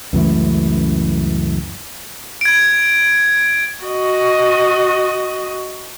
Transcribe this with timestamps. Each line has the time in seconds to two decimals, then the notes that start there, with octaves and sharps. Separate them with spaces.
0.13 C#2 F#2 E3 A3
2.41 G#6 D7
3.84 F#4 D#5